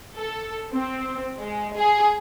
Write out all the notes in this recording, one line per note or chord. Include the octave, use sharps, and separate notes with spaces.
A4
C4
G#3
G#4